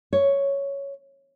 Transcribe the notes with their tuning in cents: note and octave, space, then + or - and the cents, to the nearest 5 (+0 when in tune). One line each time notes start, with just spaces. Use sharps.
C#5 +5